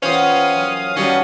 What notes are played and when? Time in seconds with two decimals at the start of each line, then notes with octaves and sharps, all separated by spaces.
0.02 E3 G3 B3 C#4 F4 C5 F5 D#6
0.56 F#2
0.96 D#3 G3 B3 C#4 F#4 A4 C#5